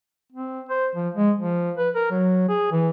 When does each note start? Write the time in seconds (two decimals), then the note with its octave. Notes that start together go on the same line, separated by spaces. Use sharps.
0.32 C4
0.69 C5
0.95 F3
1.14 G#3
1.38 F3
1.78 B4
1.95 A#4
2.11 F#3
2.49 G#4
2.71 E3